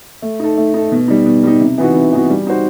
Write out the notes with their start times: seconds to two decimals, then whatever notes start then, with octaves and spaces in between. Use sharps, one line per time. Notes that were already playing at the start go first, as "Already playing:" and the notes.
0.22 A3
0.39 D#4 A4
0.57 A3
0.74 D#4 A4
0.92 B2
1.08 G3 D#4
1.26 B2
1.43 G3 D#4
1.61 C3
1.78 E3 B3 D#4 F#4
1.95 C3
2.12 E3 B3 D#4 F#4
2.30 G3
2.47 D#4 F#4 C5